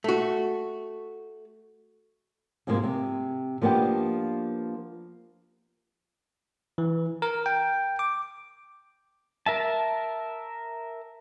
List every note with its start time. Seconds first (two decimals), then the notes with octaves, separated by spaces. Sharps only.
0.04 A3 F#4
2.67 G#2 C3 F3 G#3 A#3
2.83 C3
3.61 F3 A#3 B3 D4 G4
6.78 E3
7.22 A#4
7.46 G5
7.99 D6
9.46 A#4 E5 A5